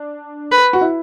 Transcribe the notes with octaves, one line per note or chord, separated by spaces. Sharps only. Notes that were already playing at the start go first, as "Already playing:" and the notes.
Already playing: D4
B4
F#4
E4